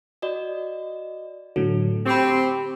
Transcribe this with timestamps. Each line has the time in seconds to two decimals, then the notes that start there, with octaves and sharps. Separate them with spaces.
0.22 F#4 D5 D#5
1.56 A2 D3 F#3 A4
2.06 C4 G4 B5 C#6 D6